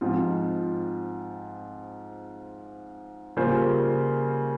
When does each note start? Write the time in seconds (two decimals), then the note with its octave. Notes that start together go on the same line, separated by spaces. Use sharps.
0.01 G#2 F3 C4 F4
3.37 C#3 G3 A#3 F4 C5